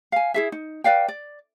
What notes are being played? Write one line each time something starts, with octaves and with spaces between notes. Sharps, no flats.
F5 G#5
E4 G#4 E5
D#4
B4 D5 F5 G5
D5